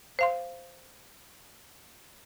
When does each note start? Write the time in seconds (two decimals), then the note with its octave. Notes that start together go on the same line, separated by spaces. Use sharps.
0.19 C5 F5 C6